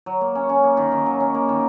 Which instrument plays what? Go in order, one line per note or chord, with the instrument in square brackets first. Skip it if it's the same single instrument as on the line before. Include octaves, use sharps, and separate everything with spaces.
[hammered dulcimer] F#3
A#3
C#4
C#4
A#3
D#3
D#3
F#3
C#4
A#3
D#3